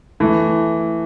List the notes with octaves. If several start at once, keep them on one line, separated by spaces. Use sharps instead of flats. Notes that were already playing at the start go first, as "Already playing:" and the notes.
E3 A3